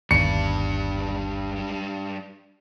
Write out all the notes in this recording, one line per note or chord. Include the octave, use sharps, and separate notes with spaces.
G1 D#2 G3 D4 C#7